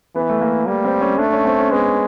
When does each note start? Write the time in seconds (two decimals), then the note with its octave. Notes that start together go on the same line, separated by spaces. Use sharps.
0.15 E3 B3
0.30 A3
0.41 A#3
0.67 G3 A#3
0.85 C4
1.01 C#4
1.18 A3 D4
1.33 C#4
1.45 C4
1.59 C#4
1.71 G#3 B3